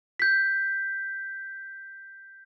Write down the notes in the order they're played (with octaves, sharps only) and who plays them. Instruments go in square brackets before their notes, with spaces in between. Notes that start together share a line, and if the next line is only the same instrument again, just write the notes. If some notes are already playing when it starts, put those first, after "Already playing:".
[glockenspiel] G6 B6